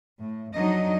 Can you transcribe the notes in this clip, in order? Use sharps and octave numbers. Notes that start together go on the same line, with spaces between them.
A2
F2 F#3 D4 D#4 D#5